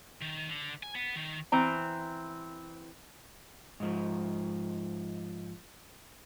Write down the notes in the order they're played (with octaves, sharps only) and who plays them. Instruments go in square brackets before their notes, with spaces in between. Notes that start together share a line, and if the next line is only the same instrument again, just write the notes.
[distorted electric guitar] D#3
D3
G#5
B3
D#3
[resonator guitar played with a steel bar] E3 C4 A#5
[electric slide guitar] G#2 F3